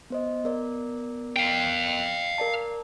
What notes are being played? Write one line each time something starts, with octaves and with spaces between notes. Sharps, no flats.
B3 C5 D#5
B3 A#4 D5
F5 G5
A#4 D5 A5